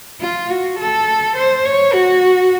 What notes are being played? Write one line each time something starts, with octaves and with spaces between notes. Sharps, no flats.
F4
F#4
A4
C5
C#5
F#4